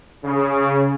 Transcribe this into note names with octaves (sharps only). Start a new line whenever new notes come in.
C#3